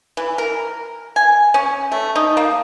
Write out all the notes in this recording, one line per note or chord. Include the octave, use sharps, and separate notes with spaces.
E3
A#4
G#5
C#4
A3
D#4
A#3